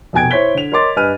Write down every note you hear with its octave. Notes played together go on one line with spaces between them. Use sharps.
F1 B2 G5 G#5 G#6 D7
E4 C5 C#5 G#6 B6 G7
D3 F7
A#4 C#5 D#5 C6 D6 A6
G2 B4 D#5 G#5 F6 D#7